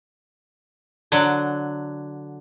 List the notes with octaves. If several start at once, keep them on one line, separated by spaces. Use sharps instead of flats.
D3 F#3